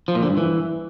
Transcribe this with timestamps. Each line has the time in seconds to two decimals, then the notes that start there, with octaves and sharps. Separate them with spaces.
0.08 F3
0.15 A#2
0.23 D3
0.30 G2
0.37 E3